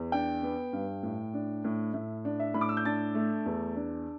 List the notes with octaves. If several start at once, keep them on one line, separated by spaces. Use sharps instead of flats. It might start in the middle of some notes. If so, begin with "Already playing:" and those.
Already playing: E2
D4 G5
B3
G2
A2
D4
A2
A2 E5
D4
E5
A2 B5
D6
E6
G6
D4 A5 A6
A3
E2
D4